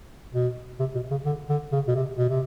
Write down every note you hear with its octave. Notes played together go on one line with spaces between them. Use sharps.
B2
C3
B2
C#3
D3
D3
C#3
B2
C3
B2
C3